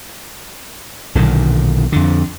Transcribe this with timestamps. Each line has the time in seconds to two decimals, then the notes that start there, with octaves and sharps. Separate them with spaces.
1.15 B1 A#2 D3 D#3
1.92 F2 D3